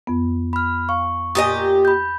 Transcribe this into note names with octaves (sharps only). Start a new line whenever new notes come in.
F2 B3
B5 F6
F5 C#6
A#2 G4 D#5 G#5 D#6
B5 G6